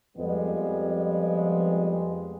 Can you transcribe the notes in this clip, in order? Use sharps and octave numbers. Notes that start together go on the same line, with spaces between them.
F2 G3 G#3 B3